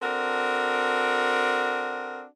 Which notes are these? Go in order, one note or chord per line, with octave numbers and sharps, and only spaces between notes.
C4 D4 F#4 A4 A#4